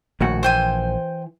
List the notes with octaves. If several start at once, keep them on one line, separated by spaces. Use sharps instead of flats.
A#1 D#2 A2 F#4
E3 C5 G5 G#5